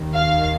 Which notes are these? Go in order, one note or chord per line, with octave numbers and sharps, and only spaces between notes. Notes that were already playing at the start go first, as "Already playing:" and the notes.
Already playing: D#2 D#3
F5